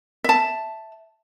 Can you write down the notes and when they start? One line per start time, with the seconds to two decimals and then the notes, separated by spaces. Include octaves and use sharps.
0.24 E5 A5